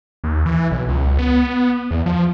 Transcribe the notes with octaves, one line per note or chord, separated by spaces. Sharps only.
D#2
E3
B1
C#2
B3
E2
F3